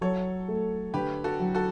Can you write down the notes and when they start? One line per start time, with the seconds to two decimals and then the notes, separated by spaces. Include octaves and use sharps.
0.01 F#3 A4 C#5
0.48 A3
0.94 D3 G4 B4
1.24 F#4 A4
1.40 F#3
1.55 F#4 A4